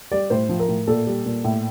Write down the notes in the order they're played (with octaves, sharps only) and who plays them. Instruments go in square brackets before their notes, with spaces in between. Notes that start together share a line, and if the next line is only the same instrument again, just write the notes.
[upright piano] G3 D5
A2 C5
F3
A#4
A2
A#2 A4
G3
A#2
A2